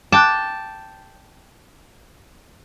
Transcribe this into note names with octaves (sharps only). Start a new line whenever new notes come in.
G5 A5 D6 F#6